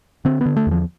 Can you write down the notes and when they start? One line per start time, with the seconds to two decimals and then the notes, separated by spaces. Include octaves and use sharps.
0.25 D3 C4
0.41 D3 B3
0.57 A3
0.67 E2 F3